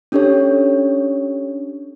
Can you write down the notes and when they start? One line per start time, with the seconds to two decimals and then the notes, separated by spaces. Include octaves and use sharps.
0.12 C#4 D4 G4 A4 C#5